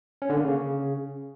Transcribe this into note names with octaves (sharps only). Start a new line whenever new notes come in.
C#4
D3
A#3
C#3